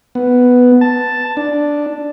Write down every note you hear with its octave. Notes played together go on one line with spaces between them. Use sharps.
B3
A5
D4